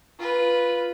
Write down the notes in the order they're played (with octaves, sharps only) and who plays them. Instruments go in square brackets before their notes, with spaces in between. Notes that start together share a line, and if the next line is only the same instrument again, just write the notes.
[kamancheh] F4 B4